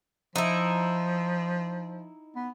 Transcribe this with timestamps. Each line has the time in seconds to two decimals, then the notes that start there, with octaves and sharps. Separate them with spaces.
0.36 F3 D#4 E4
2.36 B3